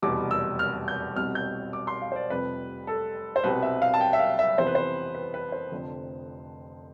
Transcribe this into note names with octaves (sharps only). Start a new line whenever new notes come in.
F1 E2 B2 G3 D6
E6
F6
G6
C2 B2 G3 C4 F6
G6
D6
C6
F5
C5
D5
F1 F2 C3 G3 B4
A4
C5
C2 B2 G3 C4 B4
E5
F5
A5
G5
E5
F5
E5
F2 C3 E3 B3 C5
B4
C5
B4
B4
C5
F1 F2 D3